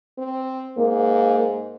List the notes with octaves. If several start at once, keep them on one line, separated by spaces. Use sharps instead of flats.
C4
G#2 A#3